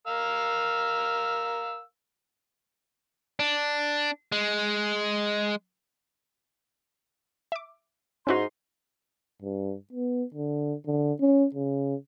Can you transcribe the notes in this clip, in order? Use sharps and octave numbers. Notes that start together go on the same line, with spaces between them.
A#4 F5 E6
D4
G#3
E5 D6
G#2 C#4 D#4 E4 F#4 C6
G2
B3
D3
D3
C#4
C#3